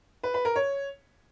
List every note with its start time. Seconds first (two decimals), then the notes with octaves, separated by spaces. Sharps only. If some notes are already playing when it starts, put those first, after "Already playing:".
0.23 B4
0.34 B4
0.45 A#4
0.56 C#5